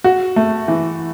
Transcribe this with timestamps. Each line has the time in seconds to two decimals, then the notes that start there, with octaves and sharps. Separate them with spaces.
0.04 F#4
0.36 A3
0.68 E3